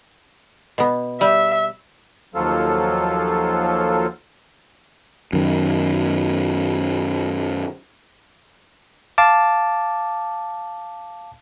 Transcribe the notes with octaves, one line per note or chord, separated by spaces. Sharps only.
B2 B3
G3 E5
D#2 F3 F#3 F4 A4
F#2 D#3
F5 A5 D6